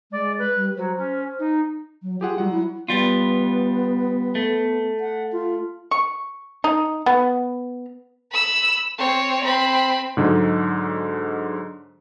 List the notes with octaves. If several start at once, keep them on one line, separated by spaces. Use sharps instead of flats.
G#3 D5
B4
G3
F#3 C5
C#4
D#4
F#3
F4 G4 G#4 F#5
F#3 G3 F#5
E4
G3 B3 F4
A3
F#5
F4
C#6
D#4
B3
B5 E6
C4 C#5
C4 B5
G#2 D3 F#3 G#3